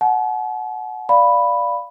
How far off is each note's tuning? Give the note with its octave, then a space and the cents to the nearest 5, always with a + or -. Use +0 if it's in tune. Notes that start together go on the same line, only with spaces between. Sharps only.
F#5 +0 A5 -45
D5 +0 F5 +0 B5 +0